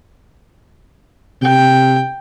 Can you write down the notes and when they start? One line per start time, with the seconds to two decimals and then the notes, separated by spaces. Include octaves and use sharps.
1.42 C3 G5